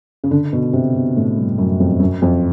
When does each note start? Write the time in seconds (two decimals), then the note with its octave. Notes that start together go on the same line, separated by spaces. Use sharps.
0.24 C#3
0.31 D3
0.53 B2
0.73 C3
0.94 B2
1.17 A2
1.37 G2
1.58 F#2
1.80 F2
2.00 F#2
2.22 F2